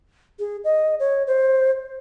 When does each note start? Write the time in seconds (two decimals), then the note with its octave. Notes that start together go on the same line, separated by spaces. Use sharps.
0.39 G#4
0.64 D#5
1.00 C#5
1.27 C5